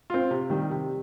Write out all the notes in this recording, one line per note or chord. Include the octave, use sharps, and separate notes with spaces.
C4 F4
C3
D#3 G3
C3